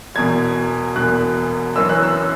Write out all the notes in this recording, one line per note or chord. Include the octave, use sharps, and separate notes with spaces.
E1 E2 B2 G#6
E1 E2 B2 F#6
F#1 F#2 E3 C#4 E6
F#6
E6